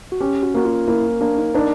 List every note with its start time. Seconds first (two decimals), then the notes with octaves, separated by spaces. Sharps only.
0.12 F#4
0.21 C#4 G4
0.43 F#4
0.54 A#3 F#4
0.65 F4
0.87 A#3 E4
1.21 A#3 D4
1.37 D#4
1.54 D4 D#4